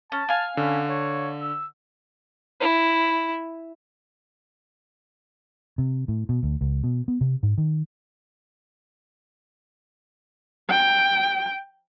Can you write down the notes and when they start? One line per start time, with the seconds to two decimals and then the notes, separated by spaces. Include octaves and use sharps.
0.12 C#4 A5
0.29 F5 G#5
0.57 D3 C#4
0.89 C#5
1.42 E6
2.60 E4
5.78 C3
6.08 A2
6.29 B2
6.43 D2
6.61 C#2
6.84 B2
7.08 B3
7.21 C3
7.43 G#2
7.58 D#3
10.70 G5